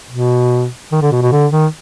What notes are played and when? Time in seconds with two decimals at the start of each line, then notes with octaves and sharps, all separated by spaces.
0.11 B2
0.92 D#3
1.02 D3
1.12 B2
1.22 B2
1.32 D3
1.52 D#3